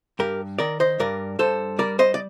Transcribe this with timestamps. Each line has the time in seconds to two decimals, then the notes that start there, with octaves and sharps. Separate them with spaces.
0.19 G2 G4 A#4
0.59 D#3 A#4 D5
0.80 C5 D#5
1.00 G2 A#4 D5
1.39 G2 A4 C5
1.79 G3 A#4 D5
1.99 C5 D#5
2.14 D5